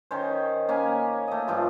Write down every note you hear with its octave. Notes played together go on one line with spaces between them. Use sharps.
D#3 C#4 C5
A#3 C#4 G#5
A3 D#5
G2 F3 G3 F4